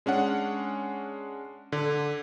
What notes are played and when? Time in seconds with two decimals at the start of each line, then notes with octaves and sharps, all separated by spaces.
0.06 G#3 C#4 D4 F#5
1.72 D3